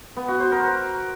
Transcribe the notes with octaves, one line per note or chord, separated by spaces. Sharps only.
B3
F#4
C5
A#4